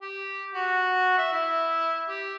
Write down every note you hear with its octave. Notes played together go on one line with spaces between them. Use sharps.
G4
F#4
E5
E4
G4